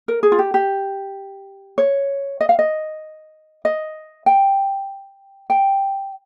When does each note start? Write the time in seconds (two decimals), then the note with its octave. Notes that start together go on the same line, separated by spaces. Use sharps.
0.08 A#4
0.23 G#4
0.32 F4
0.39 G4
0.54 G4
1.78 C#5
2.41 D#5
2.49 F5
2.59 D#5
3.65 D#5
4.26 G5
5.50 G5